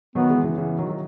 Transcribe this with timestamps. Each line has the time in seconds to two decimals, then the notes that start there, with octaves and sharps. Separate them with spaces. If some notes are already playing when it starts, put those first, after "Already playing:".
0.15 D#3 F#3 B3
0.30 E3 G#3
0.44 C#3 E3
0.57 C#3 E3
0.78 D#3 F#3
0.90 F#3